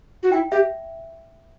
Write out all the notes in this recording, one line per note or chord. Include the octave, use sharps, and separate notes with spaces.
F#4
E4 G5
G4 E5